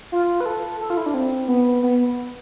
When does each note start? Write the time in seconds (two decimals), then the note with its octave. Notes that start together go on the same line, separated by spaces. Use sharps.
0.12 F4
0.40 B4
0.46 A4
0.80 A4
0.90 F4
0.97 E4
1.06 D4
1.14 C4
1.48 B3
1.83 B3